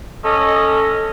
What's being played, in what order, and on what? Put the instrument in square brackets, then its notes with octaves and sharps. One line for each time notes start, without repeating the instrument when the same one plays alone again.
[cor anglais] C#4 [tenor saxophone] A4 [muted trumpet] D#5